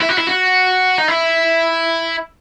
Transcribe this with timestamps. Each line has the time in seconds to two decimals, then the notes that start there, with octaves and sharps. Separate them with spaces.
0.01 E4
0.09 F#4
0.18 E4
0.27 F#4
0.98 D#4
1.08 E4